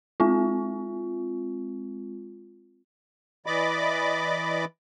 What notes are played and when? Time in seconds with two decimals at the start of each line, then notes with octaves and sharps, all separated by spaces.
0.20 G#3 C4 F4
3.46 E3 D5 D#5 B5 D6